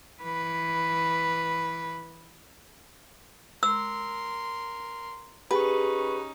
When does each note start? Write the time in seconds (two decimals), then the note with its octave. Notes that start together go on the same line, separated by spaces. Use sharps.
0.23 E3 B4
3.63 A#4 C6 E6
5.51 C#4 D#4 G4 G#4 B4 C#6